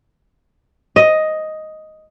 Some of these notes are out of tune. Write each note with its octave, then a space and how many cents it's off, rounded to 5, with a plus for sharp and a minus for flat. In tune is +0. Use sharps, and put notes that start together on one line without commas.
D#5 +5